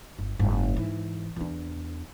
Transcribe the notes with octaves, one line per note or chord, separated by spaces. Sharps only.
G1
F#1 G#2
G#2 E3
E2 D4